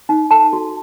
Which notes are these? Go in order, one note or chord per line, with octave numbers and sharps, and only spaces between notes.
D#4
A4 A5
F#4